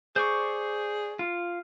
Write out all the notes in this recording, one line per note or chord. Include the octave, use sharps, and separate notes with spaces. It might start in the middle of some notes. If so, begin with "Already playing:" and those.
G#4 C5 D5 C#6
F4